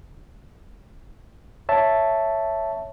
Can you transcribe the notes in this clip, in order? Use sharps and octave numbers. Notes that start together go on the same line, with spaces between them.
C#5 E5 A5